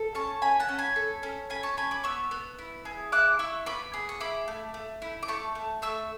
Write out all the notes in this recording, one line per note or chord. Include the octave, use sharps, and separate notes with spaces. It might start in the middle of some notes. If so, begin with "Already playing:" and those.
Already playing: A4
C#4 A5 C#6
C#4 G#5 B5
F#5 A5
C#4
G#5 B5
A4
C#4
C#4 G#5 B5
A5 C#6
C#4 G#5 B5
B5 D6
B3 C#6 E6
B3
E4
G#4
E4 D6 F#6
E4 C#6 E6
B3 B5 D6
G#4
C#6
E4 B5 D6
A3
A3
E4
D6
A3 A5 C#6
A3
A3 C#6 E6